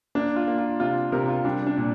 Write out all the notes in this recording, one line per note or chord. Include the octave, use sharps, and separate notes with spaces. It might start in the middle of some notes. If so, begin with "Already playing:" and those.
A#3 D4
F4
A#3
F4
C3 F4
C3 A#4
F4
G3 D4
D4
A#2